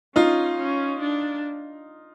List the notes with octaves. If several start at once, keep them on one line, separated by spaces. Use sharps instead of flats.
C#4 D#4 F4
C#4
D4